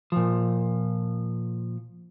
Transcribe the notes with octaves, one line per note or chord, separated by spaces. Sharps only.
A#2 F3